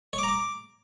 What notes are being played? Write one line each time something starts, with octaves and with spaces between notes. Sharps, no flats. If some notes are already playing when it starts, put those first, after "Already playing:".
C#5
D6
A#5
D6